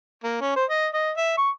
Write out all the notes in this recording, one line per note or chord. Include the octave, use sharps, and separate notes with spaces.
A#3
C#4
C5
D#5
D#5
E5
C#6